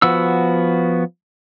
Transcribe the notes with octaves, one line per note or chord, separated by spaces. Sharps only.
F3 B3 F#4 E6